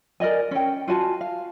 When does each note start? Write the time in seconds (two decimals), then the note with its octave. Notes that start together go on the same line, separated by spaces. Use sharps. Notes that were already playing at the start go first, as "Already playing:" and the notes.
0.20 A#4 D5 D#5 G#5
0.51 C#4 G5
0.88 F4 F#4 G#5 A5
1.21 F5